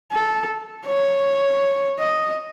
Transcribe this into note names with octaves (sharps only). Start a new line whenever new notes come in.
A4
C#5
D#5